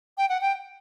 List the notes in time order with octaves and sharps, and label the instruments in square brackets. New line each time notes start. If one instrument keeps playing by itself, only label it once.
[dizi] G5
F#5
G5